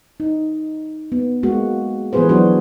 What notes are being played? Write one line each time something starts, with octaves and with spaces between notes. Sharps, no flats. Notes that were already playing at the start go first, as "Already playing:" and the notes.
D#4
B3
G#3 A#3 F#4
E3 F3 B3 G#4 B4 C5
F#3 B3 D4 F#4 C5